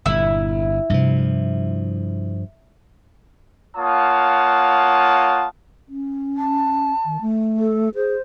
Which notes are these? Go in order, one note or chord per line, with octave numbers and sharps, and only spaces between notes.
G1 A#2 E4
G2 C3 F3 A#3
A#3 F4 C#5 F#5 A5 D#6
C#4
A5
D#3
A3
A4
G#4 C5